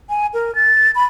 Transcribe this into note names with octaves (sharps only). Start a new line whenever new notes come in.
G#5
A#4
A6
B5